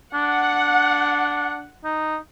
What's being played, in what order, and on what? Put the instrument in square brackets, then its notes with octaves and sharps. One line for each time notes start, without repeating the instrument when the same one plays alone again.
[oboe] D4 [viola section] F#5
[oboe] D#4